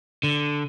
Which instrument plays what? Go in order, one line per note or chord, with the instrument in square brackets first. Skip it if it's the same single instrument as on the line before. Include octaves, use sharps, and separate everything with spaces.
[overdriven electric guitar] D3